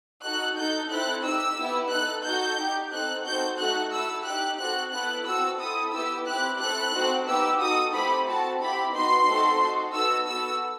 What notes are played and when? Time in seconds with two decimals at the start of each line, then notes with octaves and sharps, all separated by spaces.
0.23 D#4 F#4 A4 F#6
0.56 D#4 A4 G6
0.90 C4 E4 A4 F#6
1.23 D#4 G4 E6
1.57 B3 E4 G4
1.91 D#4 A4 F#6
2.24 D#4 F#4 A4 G6
2.57 D#4 G4
2.91 C4 D#4 A4 F#6
3.25 C4 D#4 F#4 A4 G6
3.57 A3 D#4 F#4 A4 F#6
3.91 A3 E4 A4 E6
4.25 D#4 G4 F#6
4.58 C4 F#4 A4 F#6
4.92 B3 E4 A4 F#6
5.25 C4 F#4 A4 E6
5.59 C4 E4 A4 D#6
5.92 B3 E4 G4 E6
6.26 C4 E4 G4 F#6
6.59 A3 C4 E4 A4 F#6
6.93 C4 D#4 F#4 A4
7.26 B3 D#4 G4 E6
7.60 D#4 F#4 A4 D#6
7.93 A3 C4 E4 G4 B5
8.26 C4 F#4 A4 A5
8.60 C4 E4 G4 B5
8.93 B3 D#4 F#4 C6
9.27 A3 C4 D#4 F#4 A4
9.60 D#4 F#4 A4
9.94 B3 D#4 F#4 A4 E6
10.28 B3 F#4 A4 E6